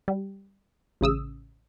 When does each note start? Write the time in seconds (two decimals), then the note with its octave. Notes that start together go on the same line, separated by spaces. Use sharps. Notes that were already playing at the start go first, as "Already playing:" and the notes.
0.08 G3
1.01 A1 C#3 D#6 E6